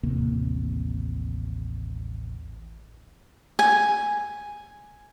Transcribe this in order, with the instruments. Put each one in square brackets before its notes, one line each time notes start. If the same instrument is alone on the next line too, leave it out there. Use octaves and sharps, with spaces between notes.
[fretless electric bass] A1 D#2 C3 A#3
[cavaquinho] G#5